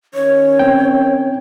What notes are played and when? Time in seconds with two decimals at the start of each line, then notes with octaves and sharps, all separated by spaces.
0.14 D#3 C#4 C#5
0.59 C4 G5